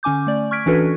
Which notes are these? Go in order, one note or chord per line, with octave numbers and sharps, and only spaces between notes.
D3 C#4 G#5 D6 G6
A3 D5
C#6 F6 G#6 B6 D7
E3 C#4 D4 F#4 A4 B4